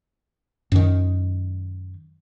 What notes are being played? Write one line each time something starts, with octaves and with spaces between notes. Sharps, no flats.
F#2 D#3